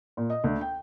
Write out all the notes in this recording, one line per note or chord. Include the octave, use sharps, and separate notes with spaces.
A#2
D#5
D2
G5